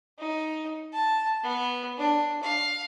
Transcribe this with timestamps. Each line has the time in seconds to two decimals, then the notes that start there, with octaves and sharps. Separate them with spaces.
0.18 D#4
0.93 A5
1.43 B3
1.97 D4
2.43 F5